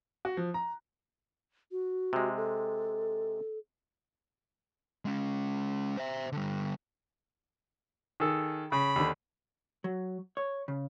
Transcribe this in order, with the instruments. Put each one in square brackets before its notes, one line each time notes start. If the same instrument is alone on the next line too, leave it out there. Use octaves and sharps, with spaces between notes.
[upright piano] F#4
F3
A#5
[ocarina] F#4
[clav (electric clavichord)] C3 G#3
[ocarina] A4
[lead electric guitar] G#3 C#4
C5 E5
D3 G3
[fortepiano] D#3 G#4 A4
[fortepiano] C#3 [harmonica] B5
[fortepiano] D#2 D3
[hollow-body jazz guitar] F#3
C#5
C#3